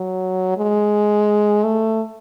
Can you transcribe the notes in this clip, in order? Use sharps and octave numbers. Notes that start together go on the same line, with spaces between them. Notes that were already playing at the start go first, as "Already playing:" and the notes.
Already playing: F#3
G#3
A3